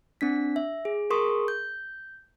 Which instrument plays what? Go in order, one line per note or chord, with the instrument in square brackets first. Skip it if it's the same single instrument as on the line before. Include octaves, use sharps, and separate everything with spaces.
[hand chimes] C4 D4 B6
E5
G#4
G#4 A#4 C6 C#6 D#6
G6